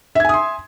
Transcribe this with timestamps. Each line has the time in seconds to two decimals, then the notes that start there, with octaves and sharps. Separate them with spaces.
0.15 E5
0.20 G#6
0.25 G#5
0.29 D#6
0.34 C6